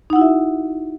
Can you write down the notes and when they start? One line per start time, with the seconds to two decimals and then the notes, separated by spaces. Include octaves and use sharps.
0.10 D#4
0.13 F#5
0.16 E4
0.19 F#4
0.21 E5